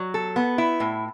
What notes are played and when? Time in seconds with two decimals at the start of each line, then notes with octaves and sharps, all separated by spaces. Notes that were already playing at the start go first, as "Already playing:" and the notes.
Already playing: F#3
0.14 A4
0.36 B3
0.58 E4
0.80 A2